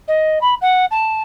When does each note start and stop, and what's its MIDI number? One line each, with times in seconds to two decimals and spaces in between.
0.07 0.38 75
0.41 0.54 83
0.61 0.85 78
0.91 1.22 81